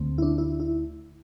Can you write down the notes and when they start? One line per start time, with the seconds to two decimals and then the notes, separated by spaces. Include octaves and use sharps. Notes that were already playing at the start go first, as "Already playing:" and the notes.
Already playing: D2 D3 A3 C4
0.18 E4
0.22 D4
0.38 E4
0.60 E4